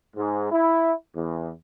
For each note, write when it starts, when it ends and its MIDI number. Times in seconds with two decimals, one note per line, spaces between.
0.16 0.48 44
0.52 0.91 64
1.15 1.50 40